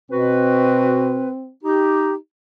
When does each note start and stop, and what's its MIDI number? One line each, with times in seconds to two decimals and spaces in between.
0.11 1.30 47
0.11 1.51 60
0.11 1.30 66
0.11 1.30 71
1.64 2.15 63
1.64 2.15 67